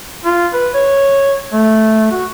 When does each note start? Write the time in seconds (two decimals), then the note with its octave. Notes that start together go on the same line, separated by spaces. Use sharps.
0.25 F4
0.54 B4
0.74 C#5
1.52 A3
2.12 F#4